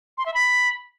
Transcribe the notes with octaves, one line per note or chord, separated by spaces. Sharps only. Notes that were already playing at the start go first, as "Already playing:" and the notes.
C6
E5
B5